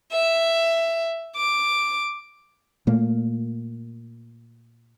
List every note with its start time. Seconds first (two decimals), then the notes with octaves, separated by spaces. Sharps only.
0.12 E5
1.37 D6
2.87 A#2 A3 A#3